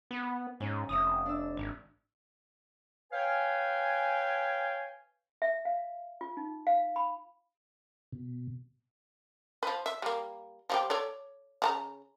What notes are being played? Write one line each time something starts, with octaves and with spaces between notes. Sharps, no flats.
B3
G#2 C#4
F1 E5 D#6
D4 E6
G#1
B4 C#5 F5 G5 G#5
E5
F5
F4
D#4
F5
B5
B2
F3 B4
E5
G3 A#3
F3 G3 G4
A4 C#5 D5
C#3 A5 A#5